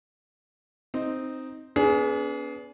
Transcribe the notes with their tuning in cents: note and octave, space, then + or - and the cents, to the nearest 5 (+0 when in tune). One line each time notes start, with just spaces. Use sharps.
C4 +0 D#4 +0
B3 +0 D4 -40 G#4 +15